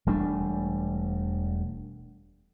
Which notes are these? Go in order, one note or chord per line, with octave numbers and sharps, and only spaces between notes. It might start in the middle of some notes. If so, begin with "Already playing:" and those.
E1 G3 A3 D4